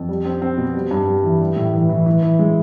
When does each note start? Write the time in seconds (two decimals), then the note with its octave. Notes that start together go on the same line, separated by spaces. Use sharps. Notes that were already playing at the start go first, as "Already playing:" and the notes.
Already playing: F2
0.09 G3
0.25 C4
0.42 C4
0.58 B2
0.75 G3
0.91 G2
1.08 G3
1.24 E3
1.41 G3
1.56 A2
1.73 E3
1.89 E3
2.06 E3
2.23 E3
2.39 G#3